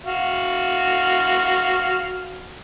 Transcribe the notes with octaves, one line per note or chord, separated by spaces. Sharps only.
F#4 F5